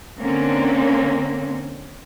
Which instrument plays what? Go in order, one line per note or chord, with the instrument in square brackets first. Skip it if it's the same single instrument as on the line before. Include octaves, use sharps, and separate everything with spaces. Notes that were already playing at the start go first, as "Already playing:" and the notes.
[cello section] D3 A#3 C4 C#4